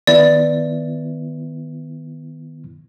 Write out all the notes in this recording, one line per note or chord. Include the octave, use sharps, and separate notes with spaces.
D#3 B3 E4 D5